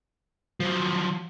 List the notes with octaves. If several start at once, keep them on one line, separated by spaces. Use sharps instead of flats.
F3 F#3